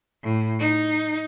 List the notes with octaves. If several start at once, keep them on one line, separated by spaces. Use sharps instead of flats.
A2
D#4